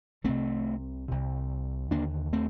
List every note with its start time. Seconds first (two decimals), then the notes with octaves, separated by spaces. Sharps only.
0.24 C2 C3 A3 C4
1.08 C2 C3
1.91 D#2 D3 A#3 D4
2.33 A3 C4